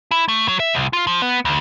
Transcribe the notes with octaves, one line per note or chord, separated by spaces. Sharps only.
E4
A3
F#3
E5
C2
F4
F3
B3
D2